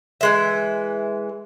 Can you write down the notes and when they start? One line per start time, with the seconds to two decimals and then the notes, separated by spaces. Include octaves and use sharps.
0.21 E3 G#3 E5